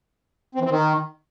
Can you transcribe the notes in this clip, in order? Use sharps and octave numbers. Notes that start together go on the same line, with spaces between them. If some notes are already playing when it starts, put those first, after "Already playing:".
C4
E3
C4
D#3